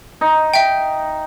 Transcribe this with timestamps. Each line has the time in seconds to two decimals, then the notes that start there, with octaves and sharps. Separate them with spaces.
0.21 D#4
0.54 E5 G5